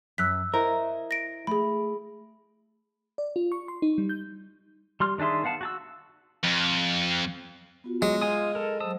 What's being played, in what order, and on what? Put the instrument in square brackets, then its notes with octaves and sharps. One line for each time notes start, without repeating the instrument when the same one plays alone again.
[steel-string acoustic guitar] F#2 [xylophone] E6 F#6 B6
[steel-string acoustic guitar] E4 C5 D#5 [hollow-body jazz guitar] A#4
[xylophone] A#6 D7
[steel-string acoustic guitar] A3 [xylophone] G#4 B5
[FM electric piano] D5
F4
C#6
C6
D#4
G3
G6
[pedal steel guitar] G3 C6 F6
D#3 D4 G#4 E5 C6
B3 F5 F#5 A5
F#4 A5 E6
[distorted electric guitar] F2
[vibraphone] B3 F4 F#4
[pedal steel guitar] F#3 [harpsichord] G#3
[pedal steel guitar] F4 G#5 D#6 [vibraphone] D#5
[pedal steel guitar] A4 A#4
[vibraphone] F#3 C5 [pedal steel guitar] A5 D#6 E6